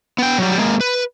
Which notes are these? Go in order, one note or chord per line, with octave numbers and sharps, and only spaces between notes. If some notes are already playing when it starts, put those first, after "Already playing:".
B3 G5
F#3 G3
G#3 A#3
B4